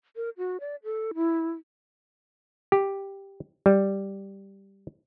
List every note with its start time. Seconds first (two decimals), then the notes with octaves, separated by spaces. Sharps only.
0.16 A#4
0.38 F#4
0.60 D5
0.84 A4
1.15 E4
2.72 G4
3.66 G3